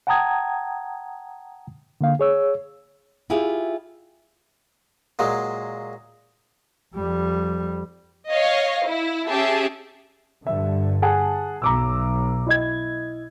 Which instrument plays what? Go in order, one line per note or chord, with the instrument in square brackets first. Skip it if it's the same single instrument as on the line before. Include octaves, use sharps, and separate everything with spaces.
[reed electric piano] F#5 G5 A5 A#5 D#6 G#6
D3 A#3 F5
G#4 C#5 E6
[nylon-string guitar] E4 F4 G4 G#4 E5 F5
[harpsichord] A#2 F#3 G#3
[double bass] F2 G3
[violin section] C#5 D#5 F5
E4
C#4 G4 G#4 E5 A5
[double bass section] G2 D3 [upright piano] E5
[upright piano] G#4 F#5 A5
[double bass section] B1 [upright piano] A#5 D6 E6
[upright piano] E4 D#5 G#6